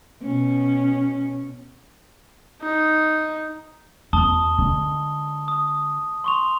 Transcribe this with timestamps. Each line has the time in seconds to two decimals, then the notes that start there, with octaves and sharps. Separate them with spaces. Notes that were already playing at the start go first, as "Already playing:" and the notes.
0.22 B2 C#4
2.61 D#4
4.13 E2 A5 D#6 G7
4.58 D3 G#3
5.48 D#6
6.24 C6 C#6 F7